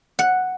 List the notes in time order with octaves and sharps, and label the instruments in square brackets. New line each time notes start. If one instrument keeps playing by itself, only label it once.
[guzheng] F#5